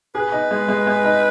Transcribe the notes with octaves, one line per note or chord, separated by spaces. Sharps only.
G#4 B4
D#4
G#3
G#3
G#3
D#4